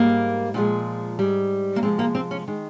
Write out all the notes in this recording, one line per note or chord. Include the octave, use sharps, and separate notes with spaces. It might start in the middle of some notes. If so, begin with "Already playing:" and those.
Already playing: G#2 G3 A#3
A#2 F3 G#3
G#2 G3
A#3
C3 F3 G#3 C4
A#3
C4
C#4
D#3 G#3